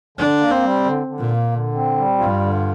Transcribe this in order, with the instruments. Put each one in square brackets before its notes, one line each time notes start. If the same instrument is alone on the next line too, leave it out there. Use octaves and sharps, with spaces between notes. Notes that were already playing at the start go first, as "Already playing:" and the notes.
[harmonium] D3 [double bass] D4
[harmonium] A#3
[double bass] C4
[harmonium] G3
D3
D3
[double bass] A#2
[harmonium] A#3
D3
C4
G3
[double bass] G2 [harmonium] F4
[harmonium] D3